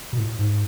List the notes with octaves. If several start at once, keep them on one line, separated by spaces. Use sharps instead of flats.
B2
A2
G#2